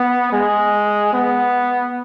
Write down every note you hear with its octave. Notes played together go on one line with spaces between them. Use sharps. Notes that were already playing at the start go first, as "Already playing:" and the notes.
Already playing: B3
G#3
B3